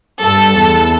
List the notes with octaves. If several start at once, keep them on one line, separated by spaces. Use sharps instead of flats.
G2 A4
E2